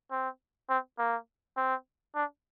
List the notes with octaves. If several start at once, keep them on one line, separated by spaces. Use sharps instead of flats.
C4
C4
A#3
C4
D4